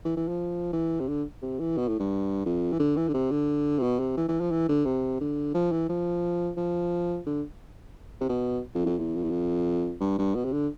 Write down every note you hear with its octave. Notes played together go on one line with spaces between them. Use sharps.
E3
E3
F3
E3
C3
D3
C3
E3
B2
A2
G2
F2
E3
D3
E3
D3
C3
D3
C3
B2
C3
E3
E3
F3
E3
D3
C3
D3
F3
E3
F3
F3
D3
C3
B2
F2
E2
F2
E2
F2
E2
F2
G2
G2
B2
C3
D3